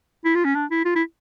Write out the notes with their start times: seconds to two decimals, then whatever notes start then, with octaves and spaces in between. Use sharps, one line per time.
0.25 E4
0.35 F4
0.45 C#4
0.55 D4
0.71 E4
0.85 F4
0.96 E4